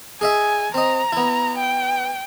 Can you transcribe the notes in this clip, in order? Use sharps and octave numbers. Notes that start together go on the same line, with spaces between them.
G#4 D#5 E5 G#5
C4 D#5 A#5
B3 E4
G5